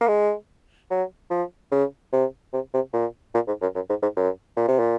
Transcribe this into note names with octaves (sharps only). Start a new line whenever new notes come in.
A#3
G#3
F#3
F3
C#3
C3
C3
C3
A#2
A#2
G#2
F#2
F#2
G#2
G#2
F#2
A#2
C3
A#2